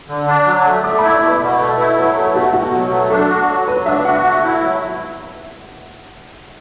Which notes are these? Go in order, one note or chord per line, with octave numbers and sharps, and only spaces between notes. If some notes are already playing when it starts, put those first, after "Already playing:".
D3
D4
F#3
A3
A3 D6
E4 B5
D5
B2
B4
B2
A3
E4
F#3 B4
A3 A4
B2 F#4
B2 F#4
F#3
A3
D4 A4
F#4
F#3
F#3 B4
D4 E5
F#4 F#5
A3
E4
F#3